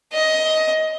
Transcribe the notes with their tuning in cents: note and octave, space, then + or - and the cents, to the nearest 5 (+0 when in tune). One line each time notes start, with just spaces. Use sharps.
D#5 +15